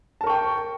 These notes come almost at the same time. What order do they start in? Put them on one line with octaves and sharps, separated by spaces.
A5 A#4 C#6 G5